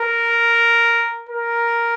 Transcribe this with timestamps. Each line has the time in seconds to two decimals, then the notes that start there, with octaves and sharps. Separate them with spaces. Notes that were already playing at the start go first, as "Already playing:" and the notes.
Already playing: A#4
1.29 A#4